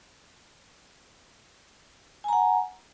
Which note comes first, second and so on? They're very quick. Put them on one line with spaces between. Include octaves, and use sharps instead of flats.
G#5 A#5 F#5